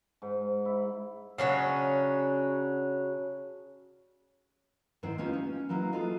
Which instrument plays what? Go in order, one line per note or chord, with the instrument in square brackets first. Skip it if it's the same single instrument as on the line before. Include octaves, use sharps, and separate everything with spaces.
[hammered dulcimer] G#2
E4
[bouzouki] C#3 F#3 C#4 D4
[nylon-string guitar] G#2 D#3 C4 E4 C5 G5
A#3 B3 C#4 D#4 F4 G4
C#4
E3 F#3 A#3 E4
F4 F#4 G#4 A4 D#5